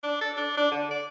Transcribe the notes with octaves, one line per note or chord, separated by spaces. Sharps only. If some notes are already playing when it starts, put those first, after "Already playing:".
D4
A4
D4
D4
D3
D5